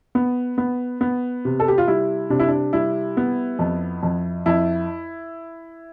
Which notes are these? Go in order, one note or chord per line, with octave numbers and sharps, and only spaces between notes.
B3
B3
B3
C3
A4
G4
F4
G3 E4
C3 D4
E4
D4
G3 E4
B3
F2
F2
F2 E4